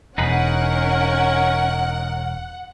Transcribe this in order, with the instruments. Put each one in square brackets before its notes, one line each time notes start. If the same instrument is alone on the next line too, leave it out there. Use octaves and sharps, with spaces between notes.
[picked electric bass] E1 [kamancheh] C#4 A#4 [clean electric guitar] D#4 G#4 B4 [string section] F#5